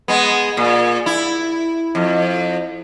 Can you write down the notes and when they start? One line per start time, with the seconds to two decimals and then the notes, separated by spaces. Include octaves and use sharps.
0.08 G#3 B3
0.57 A#2
1.06 E4
1.95 F2